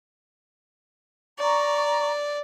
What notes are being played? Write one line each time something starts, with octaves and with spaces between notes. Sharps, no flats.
D5 A#5 C#6